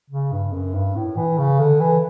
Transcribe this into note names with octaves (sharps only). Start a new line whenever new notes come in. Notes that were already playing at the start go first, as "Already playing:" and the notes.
C#3
G2
F#2
G2
A2
E3
C#3
D3
E3